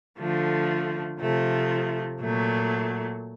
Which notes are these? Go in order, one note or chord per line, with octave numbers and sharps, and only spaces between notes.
D3 F3 A3
C3 F3 A3
A#2 F#3 A3